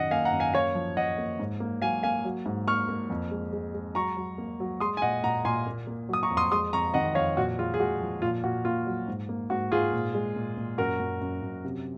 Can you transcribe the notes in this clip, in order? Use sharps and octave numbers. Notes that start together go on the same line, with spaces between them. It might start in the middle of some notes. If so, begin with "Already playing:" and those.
Already playing: F#2 D#3 D#5 F#5
A#3 F5 G#5
F#5 A#5
F#2
F5 G#5
A#3 C#5 F5
F3
F3 D#5 F#5
A#3
G#2
A#3
F#3 F5 G#5
A#3 F5 G#5
F#3
G#2
A#3 C#6 F6
A#3
F2
G#3
G#3
G#3
F#3 A#5 C#6
F#3
A#3
F#3
G#3 C6 D#6
G#5
A#2 D#5 F#5
A#2 F#5 A#5
A#2 G#5 C6
A#3
A#3
F#3 D#6
A#5 C#6
F2
C6 D#6
G#3 C6 D#6
F2 A#5 C#6
D#3 D#5 F#5
F2 C#5 F5
A#2 F#4
G#3 F4
G#4
G#3 F#4
F3
A#2 F4
A#2 F#4
A#3 F4
F#3
G#2
A#3
G#2 F#4
G#2 F4 G#4
A#2
G#3
A#2
A#2
F#2 F#4 A#4
F#2
F#2
F#2
C3